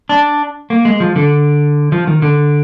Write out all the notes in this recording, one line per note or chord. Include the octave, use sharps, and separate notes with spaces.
D4
A#3
G#3
F3
D3
F3
D#3
D3